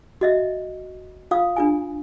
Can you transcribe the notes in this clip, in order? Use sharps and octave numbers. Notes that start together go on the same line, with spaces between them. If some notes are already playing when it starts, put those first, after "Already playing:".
F#4 D#5 E5
F4 F5 D#6
D4 F4 G#5